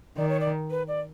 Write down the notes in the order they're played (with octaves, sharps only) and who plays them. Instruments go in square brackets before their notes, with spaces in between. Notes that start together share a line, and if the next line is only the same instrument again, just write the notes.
[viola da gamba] D#3 [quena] D5
[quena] C#5
D5
B4
D5